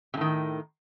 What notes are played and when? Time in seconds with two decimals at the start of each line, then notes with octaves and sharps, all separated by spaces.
0.14 C3
0.17 A2
0.21 D#3